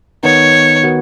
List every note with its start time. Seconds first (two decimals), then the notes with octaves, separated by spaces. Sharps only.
0.23 D#3 B3 D#4 C#5
0.83 D#3 B3 F#4